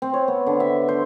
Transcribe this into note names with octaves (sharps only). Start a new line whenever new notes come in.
C4
C#5
B3
D3
E5
C5